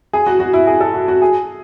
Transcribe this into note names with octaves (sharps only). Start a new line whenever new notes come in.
G#4
F#4
F#4
E4
G#4
A4
F#4
F#4
G#4